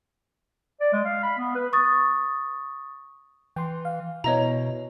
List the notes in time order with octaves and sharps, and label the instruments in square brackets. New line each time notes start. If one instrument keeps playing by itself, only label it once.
[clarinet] D5
G#3
F5
B5
B3
B4
[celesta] C#6 D#6 A6
[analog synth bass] E3 [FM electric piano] G5 C6
[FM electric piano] F5
[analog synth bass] B2 [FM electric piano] B3 E4 [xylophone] C#5 D#5 A#5